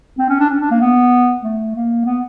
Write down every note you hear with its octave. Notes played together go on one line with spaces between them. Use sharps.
C4
C#4
D4
C#4
D4
A#3
B3
A3
A#3
B3